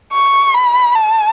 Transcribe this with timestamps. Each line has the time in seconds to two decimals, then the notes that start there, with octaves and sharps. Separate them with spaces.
0.13 C#6
0.54 B5
0.95 A5